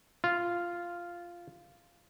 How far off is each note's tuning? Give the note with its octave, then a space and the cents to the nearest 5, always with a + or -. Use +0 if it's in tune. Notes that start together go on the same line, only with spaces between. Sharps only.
F4 -5